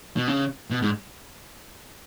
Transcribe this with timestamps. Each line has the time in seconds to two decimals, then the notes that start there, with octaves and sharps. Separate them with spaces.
0.16 B2
0.28 C#3
0.71 B2
0.82 G#2